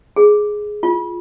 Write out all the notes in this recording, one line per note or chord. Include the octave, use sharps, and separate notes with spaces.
G#4
F4